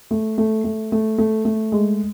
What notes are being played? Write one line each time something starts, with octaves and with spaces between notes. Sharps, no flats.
A3
A3
A3
A3
A3
A3
G#3